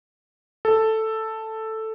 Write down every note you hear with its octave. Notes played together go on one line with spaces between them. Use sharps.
A4